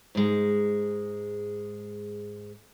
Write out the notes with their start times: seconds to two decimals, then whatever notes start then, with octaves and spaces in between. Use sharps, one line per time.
0.15 G#2 G#3